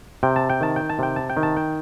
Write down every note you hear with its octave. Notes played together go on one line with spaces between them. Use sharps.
C3 G5
A5
G5
D#3 A5
G5
A5
C3 G5
A5
G5
D#3
A5
G5